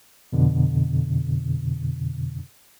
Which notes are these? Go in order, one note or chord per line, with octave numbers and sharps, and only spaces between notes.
F2 B2 D3